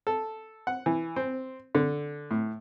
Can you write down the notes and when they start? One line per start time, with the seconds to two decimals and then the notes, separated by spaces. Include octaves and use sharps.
0.07 A4
0.67 F#5
0.86 E3
1.16 C4
1.75 D3
2.31 A2